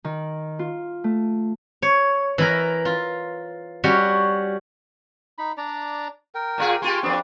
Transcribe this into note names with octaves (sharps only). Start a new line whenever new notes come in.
D#3
F4
A3
C#5
E3 E4 A#4
F4
G3 C#4 F#4 C#5
D#4 B5
D4 D5 A#5
A#4 G5
A#2 F4 G#4
A#3 F4 G4 G#5 C6 C#6
F2 B3 C4 D4 F#4